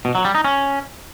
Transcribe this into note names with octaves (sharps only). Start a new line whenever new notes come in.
B2
F#3
G3
D#4
C#4